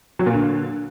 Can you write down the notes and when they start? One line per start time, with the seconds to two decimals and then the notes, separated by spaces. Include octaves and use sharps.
0.19 F#3
0.26 A#2
0.33 D3